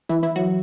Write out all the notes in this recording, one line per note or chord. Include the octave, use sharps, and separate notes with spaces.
E3 E4
E3 E4
F#3 F#4